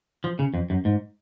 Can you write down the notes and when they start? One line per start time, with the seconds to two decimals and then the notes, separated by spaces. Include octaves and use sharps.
0.24 F3
0.39 C#3
0.54 F2
0.70 F#2
0.85 G#2